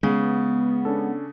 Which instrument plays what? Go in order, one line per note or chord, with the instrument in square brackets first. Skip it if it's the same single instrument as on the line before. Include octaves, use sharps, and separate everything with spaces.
[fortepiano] C#3 [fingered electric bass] G#3 [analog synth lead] B3
[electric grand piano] C#4 D4 A4